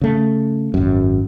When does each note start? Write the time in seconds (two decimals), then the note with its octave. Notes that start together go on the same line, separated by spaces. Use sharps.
0.01 C#3 A3
0.74 G#1 F#2